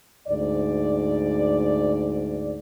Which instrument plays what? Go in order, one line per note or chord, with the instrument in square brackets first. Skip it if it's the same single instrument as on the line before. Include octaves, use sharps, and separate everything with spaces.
[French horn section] D2 G#2 D5